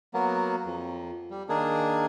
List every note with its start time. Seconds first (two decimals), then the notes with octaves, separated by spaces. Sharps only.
0.14 F#3 A#3 B3
0.65 F2
1.30 G3
1.49 D#3 A#3 D4 G#4